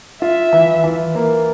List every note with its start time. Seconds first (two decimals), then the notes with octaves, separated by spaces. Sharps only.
0.22 F4 E5
0.53 E3
0.84 E3
1.15 A#3